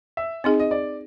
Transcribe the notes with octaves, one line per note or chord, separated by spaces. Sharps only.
E5
C4 D#4 G#4 D#5
D#5
D5